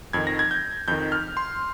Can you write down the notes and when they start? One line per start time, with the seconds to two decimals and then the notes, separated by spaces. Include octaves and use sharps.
0.13 F2 D#3 G#6
0.27 A#6
0.39 G#6
0.51 G6
0.88 F2 D#3 G6
1.12 F6
1.37 C6